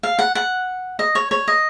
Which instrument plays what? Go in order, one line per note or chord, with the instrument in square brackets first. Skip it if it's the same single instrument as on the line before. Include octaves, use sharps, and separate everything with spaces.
[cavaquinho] F5
F#5
F#5
D#5
C#5
C#5
D#5